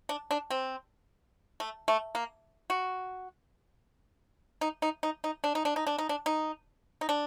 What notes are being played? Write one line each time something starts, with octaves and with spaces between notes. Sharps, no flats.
D4
D4
C4
A3
A3
A#3
F#4
D#4
D#4
D#4
D#4
D4
D#4
D4
D#4
D4
D#4
D4
D#4
D#4
D4